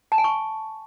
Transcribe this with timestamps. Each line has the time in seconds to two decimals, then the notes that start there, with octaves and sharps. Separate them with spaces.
0.12 A5
0.18 G#5
0.24 C#6